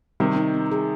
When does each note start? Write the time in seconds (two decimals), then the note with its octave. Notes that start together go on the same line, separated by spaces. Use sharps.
0.20 C3 D#3 G3
0.36 D#4
0.54 C4
0.71 G#4